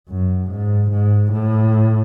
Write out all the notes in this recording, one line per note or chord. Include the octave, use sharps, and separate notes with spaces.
F#2
G#2
G#2
A2